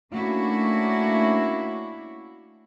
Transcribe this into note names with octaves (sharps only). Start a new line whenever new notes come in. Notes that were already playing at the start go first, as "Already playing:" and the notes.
A3 A#3 C#4 D4 E4 F#4